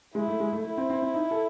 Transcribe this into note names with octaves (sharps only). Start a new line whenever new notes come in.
G#3 E4
A3
G#3
A3
A3 E4
C4
C4
C4
D#4
A4